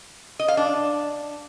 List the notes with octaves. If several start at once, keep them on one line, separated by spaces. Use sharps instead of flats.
D#5
F5
D4